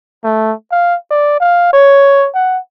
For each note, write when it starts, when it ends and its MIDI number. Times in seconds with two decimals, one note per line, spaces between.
0.24 0.53 57
0.72 0.96 77
1.11 1.40 74
1.40 1.73 77
1.73 2.29 73
2.35 2.59 78